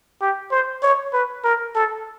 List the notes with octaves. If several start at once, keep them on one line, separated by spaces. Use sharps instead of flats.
G4
C5
C#5
B4
A#4
A4